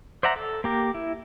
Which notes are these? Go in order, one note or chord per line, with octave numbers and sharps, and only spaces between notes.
C5 D5 E5 F#5 A#5
A4
A#3 G4 A#4
E4